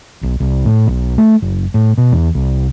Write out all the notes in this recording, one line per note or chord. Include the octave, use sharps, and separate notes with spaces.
B1
C2
A2
B1
A3
F#1
A2
B2
E2
C2